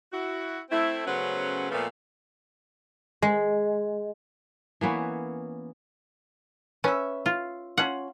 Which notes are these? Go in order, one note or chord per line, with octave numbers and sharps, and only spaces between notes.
E4 F#4
A3 C4 E4
C#3 F#3 A3 B3 C#4 C5
A#2 F3 A3 B3
G#3
E3 A#3 B3 C#4
C#4 B4 E5
F4
C#4 F4 F#5